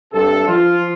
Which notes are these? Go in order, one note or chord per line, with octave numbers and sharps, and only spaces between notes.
G2 C3 A4
F3 F4